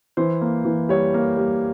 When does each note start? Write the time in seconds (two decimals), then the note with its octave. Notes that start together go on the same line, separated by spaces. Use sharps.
0.17 E3 C5
0.41 A#3
0.65 E3
0.89 G3 C#5
1.14 A#3
1.37 G3